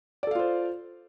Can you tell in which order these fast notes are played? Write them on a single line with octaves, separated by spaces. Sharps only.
D5 A4 F5 F4 C5